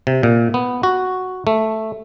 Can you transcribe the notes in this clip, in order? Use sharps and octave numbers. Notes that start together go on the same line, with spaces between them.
C3
A#2
B3
F#4
A3